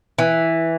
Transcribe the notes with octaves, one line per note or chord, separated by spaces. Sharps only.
E3